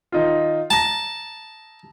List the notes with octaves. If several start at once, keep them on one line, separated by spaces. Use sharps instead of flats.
D#3 D#4 F4
A5 A#5 A#6